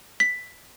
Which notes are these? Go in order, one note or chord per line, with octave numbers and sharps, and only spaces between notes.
B6